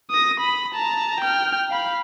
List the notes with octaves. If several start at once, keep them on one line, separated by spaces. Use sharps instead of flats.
D#6 A#6
B5
A5 A#5
G5 F6
F5 B5